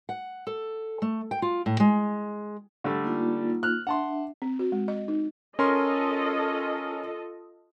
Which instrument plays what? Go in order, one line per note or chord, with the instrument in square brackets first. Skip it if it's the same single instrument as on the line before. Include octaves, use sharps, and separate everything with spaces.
[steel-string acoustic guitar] F#5
A4
A3
G5
F4
A2
G#3
[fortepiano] D3 G3 A3
[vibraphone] A#3 D#4 F4
[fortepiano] F6 F#6
[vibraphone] D4 E5 [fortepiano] F#5 A5 C6
[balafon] C4
F#4
G#3
D#5
D#4
[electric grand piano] C#4 A#4 C6 [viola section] F4 A4 D#5